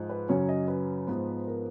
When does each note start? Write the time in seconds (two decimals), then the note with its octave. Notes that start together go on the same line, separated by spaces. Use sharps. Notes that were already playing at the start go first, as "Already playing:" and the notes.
Already playing: G#2 F3 G#3
0.09 B4
0.28 F#2 C#3 F#3 C#4 C#5
0.49 D#5
0.68 B4
1.07 G#2 F3 B3
1.47 A#4